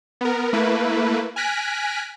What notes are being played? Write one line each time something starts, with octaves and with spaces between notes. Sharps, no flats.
B3 A#4
A3 A#3 E4 B4
G#5 F6 F#6 A#6 B6 D7